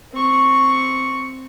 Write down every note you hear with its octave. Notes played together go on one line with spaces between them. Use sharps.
C4 C#6